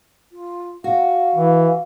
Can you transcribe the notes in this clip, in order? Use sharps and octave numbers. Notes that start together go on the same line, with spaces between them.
F4
F#4 F5
E3